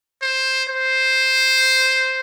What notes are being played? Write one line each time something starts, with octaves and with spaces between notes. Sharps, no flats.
C5
C5